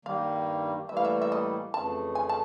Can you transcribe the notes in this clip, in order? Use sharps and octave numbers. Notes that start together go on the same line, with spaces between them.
G2 D#3 G3 A#3 F5
A2 E3 G3 A#3 E5
F5
E5
E5
D#5
F2 C#3 E3 A3 A5
G#5
A5